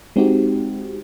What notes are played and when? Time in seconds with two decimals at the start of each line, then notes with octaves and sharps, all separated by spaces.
0.16 G#3 C4 D#4 F#4 G4